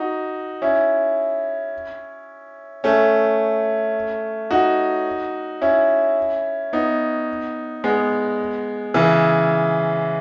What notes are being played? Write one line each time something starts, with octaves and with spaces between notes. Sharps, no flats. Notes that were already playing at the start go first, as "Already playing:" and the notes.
Already playing: D#4 F#4
C#4 E4
A3 C#4
D#4 F#4
C#4 E4
B3 D#4
G#3 B3
C#3 E3